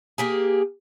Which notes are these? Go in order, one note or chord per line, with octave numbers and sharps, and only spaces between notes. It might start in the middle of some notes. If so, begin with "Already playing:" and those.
A#3 G4 G#4